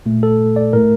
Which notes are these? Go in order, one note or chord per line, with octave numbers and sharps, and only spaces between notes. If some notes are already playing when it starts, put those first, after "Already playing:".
A#2 A3
A4
D5
A2 A3 A#4